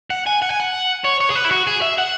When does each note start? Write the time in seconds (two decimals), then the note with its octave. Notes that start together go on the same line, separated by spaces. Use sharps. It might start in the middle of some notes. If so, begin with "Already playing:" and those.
0.10 F#5
0.26 G#5
0.42 F#5
0.50 G#5
0.60 F#5
1.04 C#5
1.20 C#5
1.30 G#4
1.35 B4
1.45 E4
1.51 F#4
1.67 G#4
1.82 E5
1.99 F#5